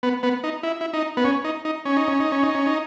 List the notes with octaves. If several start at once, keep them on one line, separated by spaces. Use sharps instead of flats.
B3
B3
D#4
E4
E4
D#4
B3
C#4
D#4
D#4
C#4
D#4
C#4
D#4
C#4
D#4
C#4
D#4